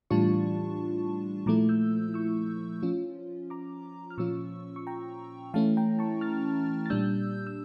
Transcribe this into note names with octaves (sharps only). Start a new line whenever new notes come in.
A2 E3 G3 D4 F4 A5 C#6
A#2 F3 A3 E4 A#5 D6
E6 G6
C#6 E6
F3 C#4 F4
A#5 D6
F6
A#2 F3 C#4 F4 C#6 E6
C#6
G5 A#5
E3 A3 C#4 E4 F5 A5
G5 A#5
A5 C#6
F6 A6
A6
A#2 G3 D4 E6 G6
E6